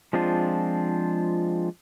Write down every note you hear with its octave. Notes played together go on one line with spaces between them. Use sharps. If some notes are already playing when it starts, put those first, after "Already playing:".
F3 G#3 C4 D4 F4